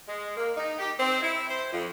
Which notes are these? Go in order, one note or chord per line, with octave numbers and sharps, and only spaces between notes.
G#3
A#3
D#4
G4
C4
E4
C5
F2